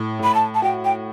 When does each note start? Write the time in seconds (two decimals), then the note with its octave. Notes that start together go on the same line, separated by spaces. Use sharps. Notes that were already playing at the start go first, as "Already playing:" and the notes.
Already playing: A2
0.19 A2 B5
0.34 A5
0.54 A5
0.62 F#4 G5
0.84 G5